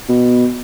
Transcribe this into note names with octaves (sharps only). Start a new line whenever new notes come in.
B2